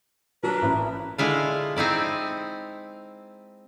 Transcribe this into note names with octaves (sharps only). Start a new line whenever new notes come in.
F#3 D4 A#4 B4 A#5
A1 E4
D3 G#3 E4 F4
C4 D#4 E4 D5